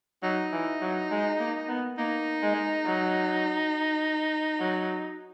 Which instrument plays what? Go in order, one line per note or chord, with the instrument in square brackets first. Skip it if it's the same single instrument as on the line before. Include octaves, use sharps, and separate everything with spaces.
[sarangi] F#3 [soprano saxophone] D#4
[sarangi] E3
F#3
G#3
A#3
B3
[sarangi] A#3 [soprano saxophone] D#4
[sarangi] G#3
F#3
F#3